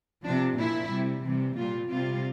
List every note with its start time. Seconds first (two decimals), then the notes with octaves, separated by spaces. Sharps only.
0.24 C3 F3 D4
0.58 A#2 F3 E4
0.91 C3 G3
1.24 C3 E3 G3
1.57 A#2 G3 F4
1.90 C3 G3 F4